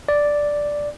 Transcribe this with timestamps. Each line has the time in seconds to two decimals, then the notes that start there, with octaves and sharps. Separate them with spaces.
0.08 D5